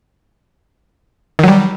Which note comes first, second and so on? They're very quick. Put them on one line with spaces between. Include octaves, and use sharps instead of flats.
D#3 F#3 G3